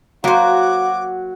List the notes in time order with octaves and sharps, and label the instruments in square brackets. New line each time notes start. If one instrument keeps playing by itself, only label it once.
[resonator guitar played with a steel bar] F#3 [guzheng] A#3 C5 [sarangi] F#4 [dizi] D6